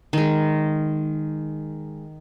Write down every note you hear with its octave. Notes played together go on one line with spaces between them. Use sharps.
D#3 G#3